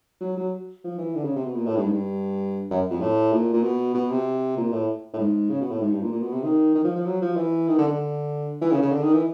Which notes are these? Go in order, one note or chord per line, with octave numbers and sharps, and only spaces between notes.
F#3
F#3
F3
E3
D3
C#3
C3
B2
A#2
A2
G2
G#2
G2
F#2
F2
A2
A#2
A#2
B2
B2
C3
A#2
A2
A2
G#2
C#3
B2
A2
G#2
G2
A#2
A#2
B2
C3
D#3
D#3
F3
F3
F#3
F3
E3
D#3
D3
D3
E3
C#3
C#3
D3
D#3
E3